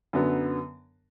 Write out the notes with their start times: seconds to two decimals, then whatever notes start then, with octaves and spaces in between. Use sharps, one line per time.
0.13 F#2 D3 F#3 B3